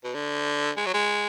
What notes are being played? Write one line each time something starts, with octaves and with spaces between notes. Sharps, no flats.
B2
D3
G#3
F#3
G#3